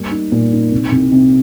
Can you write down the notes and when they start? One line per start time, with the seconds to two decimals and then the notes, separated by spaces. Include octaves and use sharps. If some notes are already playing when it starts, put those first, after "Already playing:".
Already playing: G3 A#3
0.11 D#4
0.32 A#2
0.52 D#4
0.72 C2
0.92 C2
1.12 C3